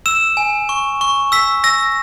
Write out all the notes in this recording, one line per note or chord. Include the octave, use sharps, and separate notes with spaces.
E6 E7
G#5
C#6
C#6
E6 B6
E6 A#6